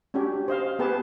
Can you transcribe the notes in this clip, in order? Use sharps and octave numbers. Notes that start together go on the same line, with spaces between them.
C#4 D4 F#4 G4
C5 D#5 F5
B3 G4 G#4 B4 A5